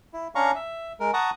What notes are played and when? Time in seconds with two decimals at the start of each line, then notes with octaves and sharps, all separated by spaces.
0.13 E4
0.35 C#4 D4 F5 A#5 C#6
0.55 E5
1.00 G#3 A#4
1.14 F#5 A5 A#5 C#6 D#6